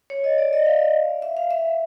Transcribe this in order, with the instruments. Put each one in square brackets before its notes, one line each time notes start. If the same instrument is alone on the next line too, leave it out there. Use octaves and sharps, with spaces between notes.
[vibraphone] C#5
D#5
D5
D#5
F5
E5
F5
E5